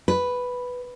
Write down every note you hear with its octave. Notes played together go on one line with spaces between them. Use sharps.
B4